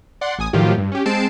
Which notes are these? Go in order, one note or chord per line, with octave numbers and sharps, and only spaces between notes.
D5 F#5 C6
A1 G#5 D#6
A2 D#3 F3 F#3 F4 G4
G2
C#4 G4
G#3 C4 A5 C7 D7 E7